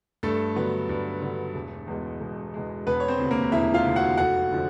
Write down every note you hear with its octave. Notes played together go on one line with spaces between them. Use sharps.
G2 A3 A4
D3 F#3 B3
G2
D3 F#3 B3
E1
E2 B2 G#3
E1
E2 B2 G#3
E1 B3 B4
C#5
C4 C5
D2 C3
A#3 A#4
E1 E4 E5
F4 F5
D2 C3
F#4 F#5
F1 F#4 F#5
D3 F3